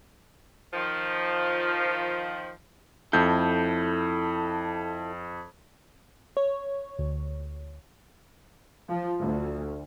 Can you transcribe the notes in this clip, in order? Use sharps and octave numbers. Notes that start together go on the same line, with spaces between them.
D#3 F3
F2 E4 A4 G6
C#5
D2
F3
D2